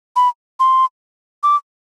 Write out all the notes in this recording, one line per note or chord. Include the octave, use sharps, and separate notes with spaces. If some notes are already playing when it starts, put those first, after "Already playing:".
B5
C6
D6